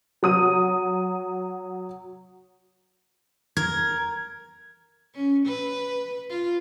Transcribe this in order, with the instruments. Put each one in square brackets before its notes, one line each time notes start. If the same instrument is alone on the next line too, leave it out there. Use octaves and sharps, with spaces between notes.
[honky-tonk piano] F#3 D#6 D#7
[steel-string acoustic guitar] A#4 [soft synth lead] G#6
[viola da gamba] C#4
B4
F4